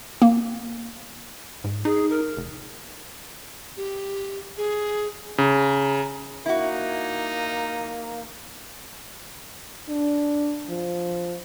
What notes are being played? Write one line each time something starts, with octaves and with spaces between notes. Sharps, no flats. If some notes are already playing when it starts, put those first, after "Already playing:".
A#3
G#2
D#4 G#4
A#4
F1
G4
G#4
C#3 A#5
A#3 D#4 E4 F#4
D4
F3